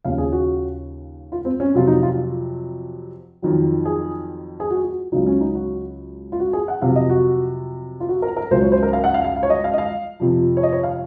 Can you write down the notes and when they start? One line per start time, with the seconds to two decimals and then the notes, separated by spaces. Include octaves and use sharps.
0.04 D#2 C#3 F3 F5
0.18 G#4
0.32 F#4
1.32 F4
1.45 C4
1.60 C#4
1.74 F2 C3 F#3 F4
1.87 D#4
2.03 F4
3.42 F2 D#3 F#3
3.85 G#4
4.60 G#4
4.71 F#4
4.84 F#4
5.12 C#2 C#3 F#3 D#4
5.26 C#4
5.41 D#4
5.55 F#4
6.32 F4
6.40 F#4
6.53 G#4
6.68 F#5
6.82 F2 C3 F#3 F5
6.96 D#5
7.10 F#4
8.00 F4
8.09 F#4
8.22 A#4
8.37 A#4
8.51 C#2 C#3 F#3 C5
8.61 C#5
8.72 C5
8.83 A#4
8.93 F5
9.04 F#5
9.14 F5
9.24 F5
9.36 F5
9.43 C#5
9.50 D#5
9.64 F5
9.74 D#5
9.78 F5
10.20 F2 C3 F3
10.57 C#5
10.63 D#5
10.73 C#5
10.83 F5